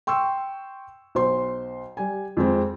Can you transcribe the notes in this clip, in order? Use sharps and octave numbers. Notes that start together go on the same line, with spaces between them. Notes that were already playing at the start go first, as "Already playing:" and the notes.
G5 C6 C#6 E6
B1 C5 C6
G3 G#5
F2 G#3 C4